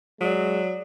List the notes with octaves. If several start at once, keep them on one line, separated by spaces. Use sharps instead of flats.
F#3 G#3 D5 D#6